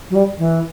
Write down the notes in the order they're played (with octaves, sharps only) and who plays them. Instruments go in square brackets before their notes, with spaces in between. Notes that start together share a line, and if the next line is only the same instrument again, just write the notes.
[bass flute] F#3
G3
E3